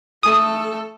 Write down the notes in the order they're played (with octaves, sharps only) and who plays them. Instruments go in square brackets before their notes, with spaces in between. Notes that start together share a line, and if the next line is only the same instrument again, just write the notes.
[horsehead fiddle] A3 A4 [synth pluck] D#6